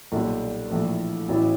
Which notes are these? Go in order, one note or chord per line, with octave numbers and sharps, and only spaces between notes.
B1 A#2 G3
A#1 A2 E3 A3
A1 A2 F#3 B3 E4